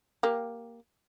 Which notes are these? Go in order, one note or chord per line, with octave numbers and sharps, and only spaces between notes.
A#3 G4